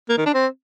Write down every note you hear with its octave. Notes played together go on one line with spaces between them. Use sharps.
A#3
D#3
D4
C4